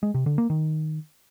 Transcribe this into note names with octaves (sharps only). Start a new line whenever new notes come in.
G#3
C3
D3
A#3
D#3